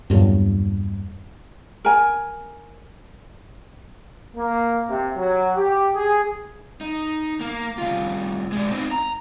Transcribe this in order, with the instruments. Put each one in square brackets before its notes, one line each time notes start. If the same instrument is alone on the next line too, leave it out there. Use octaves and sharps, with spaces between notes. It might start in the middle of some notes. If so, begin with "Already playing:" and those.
[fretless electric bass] E2 G2 A#2 F#3
[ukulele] A#4 G#5
[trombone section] A#3
C3
F#3
G4
G#4
[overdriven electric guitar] D#4
A#3
C2 F4
G#3 D4
C4 D#4
A#5